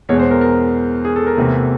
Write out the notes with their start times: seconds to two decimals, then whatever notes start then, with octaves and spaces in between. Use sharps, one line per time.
0.09 E2 B2 G#3 C#5
0.19 C5
0.31 A#4
0.41 A#4
1.05 G#4
1.16 A4
1.27 A#4
1.37 E2 C3 E3 A3